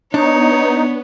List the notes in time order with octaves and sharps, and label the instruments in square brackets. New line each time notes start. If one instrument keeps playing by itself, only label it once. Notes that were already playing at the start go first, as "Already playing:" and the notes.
[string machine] B3 [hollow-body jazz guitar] D4 [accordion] D#4 [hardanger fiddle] C#5